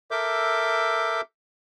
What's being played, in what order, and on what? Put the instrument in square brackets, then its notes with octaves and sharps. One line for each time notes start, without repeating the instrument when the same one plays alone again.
[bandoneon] A4 A#4 E5 D6 G6